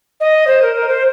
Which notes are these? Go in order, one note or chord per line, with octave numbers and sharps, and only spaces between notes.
D#5
C5
A#4
A#4
C5